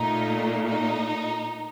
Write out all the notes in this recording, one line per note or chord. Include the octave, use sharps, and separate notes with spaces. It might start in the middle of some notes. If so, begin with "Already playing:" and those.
Already playing: A#2 A3 D#4
D#4